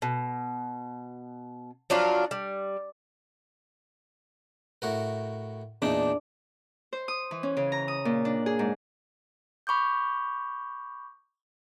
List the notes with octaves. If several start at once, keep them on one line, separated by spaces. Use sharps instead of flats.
B2
F3 F#3 D4 F4
G3
A2 F#4 A#4
E2 A#2 D4 D#4
C5
D#6
E3
C#4
C#3
A#5
D#6
A#2
D4
G#4
G#2
B5 C#6 D6 G6